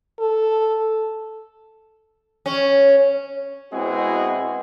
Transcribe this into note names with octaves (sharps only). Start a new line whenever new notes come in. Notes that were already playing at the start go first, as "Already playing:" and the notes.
A4
C#4
B2 G#3 C4 E4 F#4 G#4